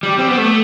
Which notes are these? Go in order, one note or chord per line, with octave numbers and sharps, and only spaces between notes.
G3
C4
B3
A3